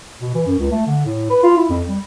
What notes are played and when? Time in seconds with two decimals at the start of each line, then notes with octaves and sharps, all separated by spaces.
0.21 B2
0.35 E3
0.47 F#2
0.59 C#2
0.71 A3
0.87 D3
1.05 A2
1.30 B4
1.43 F4
1.57 E4
1.70 F2
1.89 G3